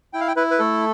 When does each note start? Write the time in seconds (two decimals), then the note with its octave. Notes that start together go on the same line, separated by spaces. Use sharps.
0.13 E4 G5
0.21 F5
0.28 G5
0.36 E4 B4
0.51 B4
0.59 A3 A4